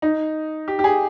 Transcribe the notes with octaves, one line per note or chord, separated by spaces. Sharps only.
D#4
G4
G4
G#4